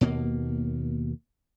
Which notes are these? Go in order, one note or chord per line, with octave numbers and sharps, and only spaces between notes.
D#2 B2 A#3